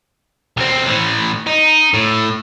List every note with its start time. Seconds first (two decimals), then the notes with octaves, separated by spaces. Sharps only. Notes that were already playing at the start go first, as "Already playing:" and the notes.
0.57 B1 C4
0.87 A2 E3
1.47 D#4
1.94 A2